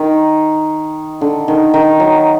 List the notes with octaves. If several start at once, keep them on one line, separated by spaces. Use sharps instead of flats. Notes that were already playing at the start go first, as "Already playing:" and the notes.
Already playing: D#3
D3
D#3
D#3
F#3